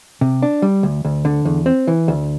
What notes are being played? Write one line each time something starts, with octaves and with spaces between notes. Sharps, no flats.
C3
D4
G3
D2
D2
D3
E2
C4
E3
D2